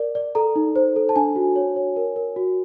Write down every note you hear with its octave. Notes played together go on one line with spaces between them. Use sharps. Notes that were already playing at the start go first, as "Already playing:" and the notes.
Already playing: A#4 D5
D5
A4 A#5
D#4
C5
A4
A5
D4 G#5
F#4
C#5
C#5
A#4
A#4
F#4